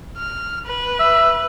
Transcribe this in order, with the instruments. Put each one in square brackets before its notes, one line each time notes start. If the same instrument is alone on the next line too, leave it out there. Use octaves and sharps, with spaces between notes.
[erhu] F6
B4
[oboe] E5